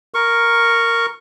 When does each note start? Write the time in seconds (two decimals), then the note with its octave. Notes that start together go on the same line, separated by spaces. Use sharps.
0.14 A#4 C#6